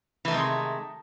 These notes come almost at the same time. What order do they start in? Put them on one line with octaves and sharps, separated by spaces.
E3 A3 D#3 C3 G#3